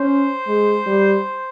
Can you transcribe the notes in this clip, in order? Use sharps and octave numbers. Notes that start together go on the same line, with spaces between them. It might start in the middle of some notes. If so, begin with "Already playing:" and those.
Already playing: C#4 C5
G#3
G3